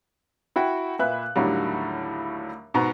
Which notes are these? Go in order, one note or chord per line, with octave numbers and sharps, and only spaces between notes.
E4 F#4 G5
A#2 B4 E5 F#6
D#2 A2 D3 F#3 G3
G#2 B2 A#5